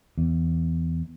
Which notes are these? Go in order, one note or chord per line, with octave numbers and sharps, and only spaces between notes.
E2